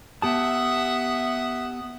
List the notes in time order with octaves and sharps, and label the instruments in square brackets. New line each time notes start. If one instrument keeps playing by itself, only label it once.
[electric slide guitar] B3 G4 A5 [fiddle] E5 F#5 [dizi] D#6